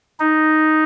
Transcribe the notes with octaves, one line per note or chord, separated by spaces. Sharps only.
D#4